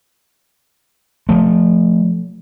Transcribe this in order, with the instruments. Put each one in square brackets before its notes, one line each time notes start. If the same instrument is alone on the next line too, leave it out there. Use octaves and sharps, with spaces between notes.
[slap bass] F3 A3